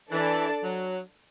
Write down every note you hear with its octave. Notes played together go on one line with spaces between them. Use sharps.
E3 D4 A4 D5 A5
F#3